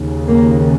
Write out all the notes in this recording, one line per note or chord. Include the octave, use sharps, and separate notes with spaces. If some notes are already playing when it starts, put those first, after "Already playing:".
Already playing: D#2 C#3
A#3